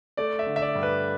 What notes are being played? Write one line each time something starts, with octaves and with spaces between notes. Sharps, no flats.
A3 D5
E5
D3
E5
D5
G2
B4